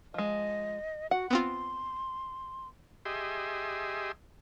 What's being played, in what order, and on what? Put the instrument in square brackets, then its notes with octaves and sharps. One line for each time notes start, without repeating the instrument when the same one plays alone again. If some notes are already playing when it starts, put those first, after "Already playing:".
[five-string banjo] F3 G#3 [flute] D#5
[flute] F#4 [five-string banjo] F#5
[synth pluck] B3 C4 F4 [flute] C6
[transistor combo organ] G4 G#4 D#5 E5 C6